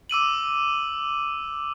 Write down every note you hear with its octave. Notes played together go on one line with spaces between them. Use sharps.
D6 E6 D#7 F#7